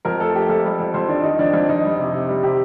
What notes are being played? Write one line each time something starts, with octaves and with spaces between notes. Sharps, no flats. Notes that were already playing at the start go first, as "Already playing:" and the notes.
F2 A#4
A3 A4
A3 G4
F2 A4
G3
F2
F2 C5
D#3 D4
D#3 D#4
F2 D4
F2
F2 D#4
G3
C3
C3
G3
C3 G4